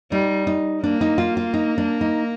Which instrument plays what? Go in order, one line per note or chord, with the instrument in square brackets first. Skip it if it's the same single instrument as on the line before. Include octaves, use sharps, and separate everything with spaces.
[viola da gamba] G3 [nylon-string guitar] D#4
[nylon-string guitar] D#4
[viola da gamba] A#3 [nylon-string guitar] D4
[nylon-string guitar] D#4
F4
F4
D#4
D4
D#4